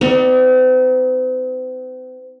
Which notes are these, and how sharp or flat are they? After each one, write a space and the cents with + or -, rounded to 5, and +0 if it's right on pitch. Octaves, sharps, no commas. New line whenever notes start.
C4 -40 D#4 +40 D5 +30